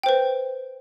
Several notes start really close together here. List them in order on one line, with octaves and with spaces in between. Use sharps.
G5 C5 B4